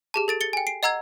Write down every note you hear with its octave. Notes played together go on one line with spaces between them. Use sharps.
G4 G#4 A5
A4 A6 D7
A6 C#7 G7
G5 G#5
C7 D7
D#5 F#5 A#5 E6 G#6